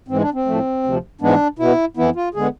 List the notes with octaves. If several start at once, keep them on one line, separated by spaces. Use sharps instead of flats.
G#2 E3 G#3 C4
D4
C4
A2 F3 A3
D2 C3 F3
G#2 E3 G#3 B3 D4
B2 B3 E4
F2 E3 B3 E4
F4
D3 G#3 B3 G#4